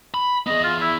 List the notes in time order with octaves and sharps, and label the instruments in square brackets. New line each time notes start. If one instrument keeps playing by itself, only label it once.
[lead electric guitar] B5
[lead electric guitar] B3 G#4 [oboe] D#5
[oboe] F4
E4